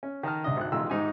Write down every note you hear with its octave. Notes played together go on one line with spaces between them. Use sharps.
C#4
D#3 D#5 A5 F6
C2 D4 D#5
G#1 F#6
A1 D#3 G#3 F4 E6
G#2 D#4 G4 G#5